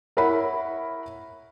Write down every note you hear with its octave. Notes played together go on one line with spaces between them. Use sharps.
E4 A#4 C#5 E5 F#5 B5